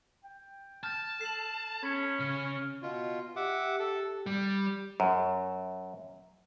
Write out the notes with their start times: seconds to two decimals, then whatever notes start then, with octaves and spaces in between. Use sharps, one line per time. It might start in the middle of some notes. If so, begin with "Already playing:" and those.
0.24 G5
0.83 A5 F6 G6 A6
1.21 A4 C7 E7 F#7
1.83 C#4 B5 G#6 C#7
2.20 C#3 F6 G7
2.82 B2 F4
3.36 G4 E5 F#5 D6
3.79 A4
4.26 G3
5.00 F#2